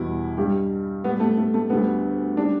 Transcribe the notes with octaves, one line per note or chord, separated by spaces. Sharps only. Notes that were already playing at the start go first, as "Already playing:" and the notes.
Already playing: E2 B2 G3 E4
G2 G3 G4
A2 G3 B3
A3
A3
A3
D2 D3 G3 B3
G3 D4